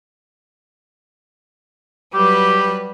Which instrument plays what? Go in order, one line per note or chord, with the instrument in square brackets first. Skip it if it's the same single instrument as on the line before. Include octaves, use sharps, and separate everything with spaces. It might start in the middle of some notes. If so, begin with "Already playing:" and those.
[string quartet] F#3 G3 B4 [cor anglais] G4